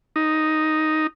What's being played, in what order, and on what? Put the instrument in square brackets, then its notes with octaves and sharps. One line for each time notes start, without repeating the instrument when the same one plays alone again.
[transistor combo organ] D#4